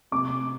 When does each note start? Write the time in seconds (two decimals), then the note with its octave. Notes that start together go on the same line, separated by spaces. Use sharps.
0.12 C3 D6